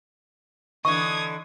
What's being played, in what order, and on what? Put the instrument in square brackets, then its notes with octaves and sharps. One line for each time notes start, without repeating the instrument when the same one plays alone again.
[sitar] D3 E3 D#5 [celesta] C#6 [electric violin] D#6 G#6